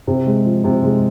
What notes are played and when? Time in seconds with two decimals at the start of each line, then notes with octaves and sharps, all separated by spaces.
0.07 C3
0.27 G#3
0.46 F3
0.64 C3
0.84 G#3